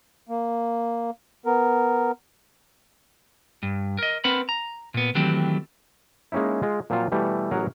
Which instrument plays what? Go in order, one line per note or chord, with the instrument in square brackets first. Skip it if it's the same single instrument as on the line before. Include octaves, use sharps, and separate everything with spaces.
[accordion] A#3
B3 A#4
[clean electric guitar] G2
A#4 D#5
C4 A#4 B4 F#5 B5
A#5
A#2 B3
D#3 E3 F#3 A3 C4 G4
[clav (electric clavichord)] G#3 A#3 C#4 D#4 E4
G#3 F4
A#2 F3 F#3 C4 F4
B2 E3 G3 A3
A1 F#3 B3 G#4 A#4 F#5